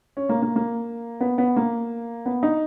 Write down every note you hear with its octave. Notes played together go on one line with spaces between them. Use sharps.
C#4
A#3
A#3
A#3
B3
B3
A#3
B3
D#4